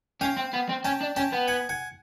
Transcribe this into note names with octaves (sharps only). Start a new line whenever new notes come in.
C#4 F5 G5
C4
B3
C4
C#4 G5 A5
D4
C#4 G5 A5
B3
F#5 G#5
F#5 G#5